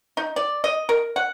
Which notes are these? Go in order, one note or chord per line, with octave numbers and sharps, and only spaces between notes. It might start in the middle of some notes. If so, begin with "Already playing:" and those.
D#4
D5
D#5
A#4
F#5